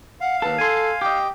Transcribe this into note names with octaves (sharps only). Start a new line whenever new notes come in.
F5 F#5
D#2 A4 B4
A4 G#5 C6
G4 D#5 G5